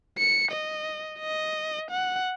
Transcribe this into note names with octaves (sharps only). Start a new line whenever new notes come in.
C#7
D#5
D#5
F#5